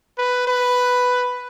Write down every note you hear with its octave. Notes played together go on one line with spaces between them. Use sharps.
B4
B4